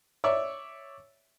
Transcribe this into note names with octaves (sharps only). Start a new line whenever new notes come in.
C#5 D5 E5